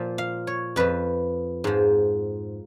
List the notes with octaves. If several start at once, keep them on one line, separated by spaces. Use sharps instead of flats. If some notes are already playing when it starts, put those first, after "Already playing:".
Already playing: A#2 F3
F5
C#5
F2 F3 B4
G#2 F3